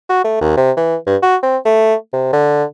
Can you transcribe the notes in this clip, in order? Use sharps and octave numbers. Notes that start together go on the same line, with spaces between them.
F#4
A3
D#2
C3
E3
G2
F#4
C4
A3
C3
D3